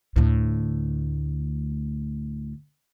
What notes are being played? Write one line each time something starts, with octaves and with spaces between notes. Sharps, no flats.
D2 A2